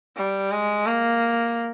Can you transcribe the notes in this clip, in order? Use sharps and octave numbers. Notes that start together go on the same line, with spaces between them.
G3
G#3
A#3